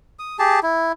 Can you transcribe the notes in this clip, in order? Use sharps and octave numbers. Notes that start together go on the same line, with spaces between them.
D#6
G4 G#4 A5
E4